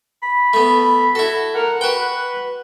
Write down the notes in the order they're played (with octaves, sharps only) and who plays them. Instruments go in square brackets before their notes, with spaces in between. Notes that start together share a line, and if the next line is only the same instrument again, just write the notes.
[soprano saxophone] B5
[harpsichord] A3 B3
[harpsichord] E4 A4 [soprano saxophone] F#4
[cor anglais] A#4 [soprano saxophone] F#5
[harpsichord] F#4 G5 [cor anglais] B4